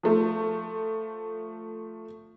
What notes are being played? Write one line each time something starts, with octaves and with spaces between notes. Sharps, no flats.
F3 A3